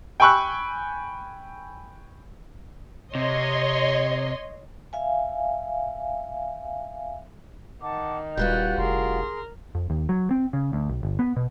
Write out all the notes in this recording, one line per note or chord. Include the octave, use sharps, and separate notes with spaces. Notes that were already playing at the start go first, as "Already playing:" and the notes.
G5 G#5 B5 C#6 E6 F#6
C3 C#5 D#5 C6
E5 F5 G#5
D#3 F#5 A5 D6
D#1 G3 F4 F#4 B4 F#6 G6
F1 G#4 A#4 C6
F2
D#2
F#3
C4
C#3
D2
B1
G1
B3
B2